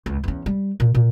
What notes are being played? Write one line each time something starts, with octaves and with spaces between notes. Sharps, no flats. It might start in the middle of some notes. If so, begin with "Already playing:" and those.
C#2
E2 C#4
G3
A#2
A#2